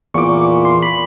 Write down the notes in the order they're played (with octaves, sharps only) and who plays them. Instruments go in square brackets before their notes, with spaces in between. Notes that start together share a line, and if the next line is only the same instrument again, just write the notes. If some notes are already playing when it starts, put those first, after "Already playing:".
[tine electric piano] E2 [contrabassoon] A#2 [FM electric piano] C#6 D6
[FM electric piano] C6
[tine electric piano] B5